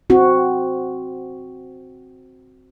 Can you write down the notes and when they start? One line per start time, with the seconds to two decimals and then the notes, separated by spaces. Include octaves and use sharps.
0.10 C4 F#4